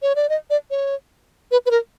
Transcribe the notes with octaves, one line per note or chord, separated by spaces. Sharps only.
C#5
D5
D#5
D5
C#5
B4
B4
A#4